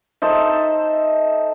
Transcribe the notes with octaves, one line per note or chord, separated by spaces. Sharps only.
D#4 A4 C5 E5